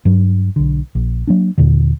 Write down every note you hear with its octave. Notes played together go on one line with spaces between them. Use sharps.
G2 F#3
B1 D3
A#1
F#3 A#3 D4
D#2 A#2 D3